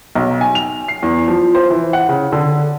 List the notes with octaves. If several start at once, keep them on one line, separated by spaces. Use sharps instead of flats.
B1
G#5
F7
C7
E2
F3
C5
E3
F#5
C#3
D3